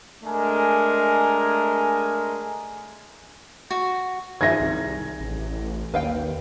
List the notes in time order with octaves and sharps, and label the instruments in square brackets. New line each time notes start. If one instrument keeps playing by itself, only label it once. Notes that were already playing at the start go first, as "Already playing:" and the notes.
[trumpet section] G#3 A3 D4 A#4 G#5
[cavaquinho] F#4
[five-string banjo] D#3 G#4 E5 [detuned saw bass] F3 [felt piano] G#6 A#6
[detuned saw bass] C2
A1
[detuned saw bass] D#2 [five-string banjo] B4 F5 G5